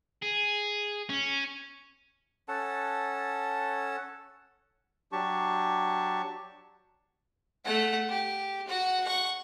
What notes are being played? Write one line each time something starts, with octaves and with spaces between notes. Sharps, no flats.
G#4
C#4
C#4 A4 F#5 A5
F#3 D4 G4 A5 C#6
A3 F#5
G4
F#4 F#5
F#5 C#6